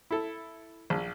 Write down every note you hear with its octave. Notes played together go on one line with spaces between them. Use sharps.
E4 A4
A#1